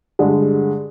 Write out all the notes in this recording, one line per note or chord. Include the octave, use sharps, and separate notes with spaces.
G2 D3 G#3